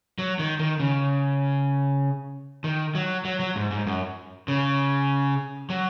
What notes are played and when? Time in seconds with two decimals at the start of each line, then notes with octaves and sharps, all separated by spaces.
0.19 F#3
0.39 D#3
0.59 D#3
0.80 C#3
2.64 D#3
2.95 F#3
3.25 F#3
3.40 F#3
3.56 G#2
3.71 G#2
3.87 F#2
4.48 C#3
5.70 F#3